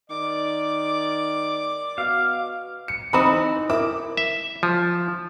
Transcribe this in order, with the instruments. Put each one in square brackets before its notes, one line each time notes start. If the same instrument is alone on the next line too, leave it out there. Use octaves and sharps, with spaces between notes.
[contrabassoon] D#3 [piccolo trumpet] D5 [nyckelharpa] D6
[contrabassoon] B2 [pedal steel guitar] F5
[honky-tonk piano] C#7
[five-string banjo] E3 C4 D#4 [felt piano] A#5 D#6 [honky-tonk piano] B5
[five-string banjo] E4 [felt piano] A#4 [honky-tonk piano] D6
[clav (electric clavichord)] E5
F3